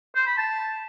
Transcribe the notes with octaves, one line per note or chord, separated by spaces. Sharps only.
C5
B5
A5